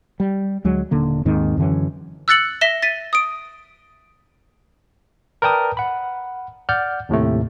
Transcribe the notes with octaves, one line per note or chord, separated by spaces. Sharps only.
G3
D2 F#3 G#3
D#1 D3 A#3
D#2 G#2 D#3 C4
F#2 D3 E3 C#4
E6 F#6 A6 C#7 F#7
E5 A#6 B6 E7 G7
A6 B6 D#7
D#6 D7
A#4 B4 D5 G5 A5 D#6
F#5 B5
D5 F#5 F6 G6
D#2 A2 C3 A3